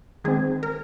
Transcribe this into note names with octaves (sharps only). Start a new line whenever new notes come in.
D#3 G#3 C4 G#4
A#4